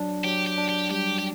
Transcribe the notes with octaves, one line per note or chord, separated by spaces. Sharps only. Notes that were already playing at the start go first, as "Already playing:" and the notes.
Already playing: F#3 D4
F#3 G4
G4
D4
G4
G3 G4
G4